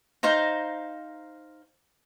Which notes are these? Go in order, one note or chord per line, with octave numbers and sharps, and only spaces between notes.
D#4 C5 F5 A#5